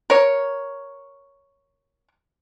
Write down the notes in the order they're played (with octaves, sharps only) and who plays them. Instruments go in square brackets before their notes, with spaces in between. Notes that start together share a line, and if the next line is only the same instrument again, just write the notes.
[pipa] A#4 C#5